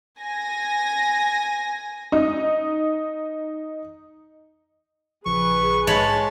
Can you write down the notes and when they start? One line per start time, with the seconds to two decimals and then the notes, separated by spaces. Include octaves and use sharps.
0.20 G#5 A#6
2.12 D#4 D#6
5.26 A#1 C#3 F3 G#4 B4 C#6
5.87 G#2 G#3 C#5 A5 B5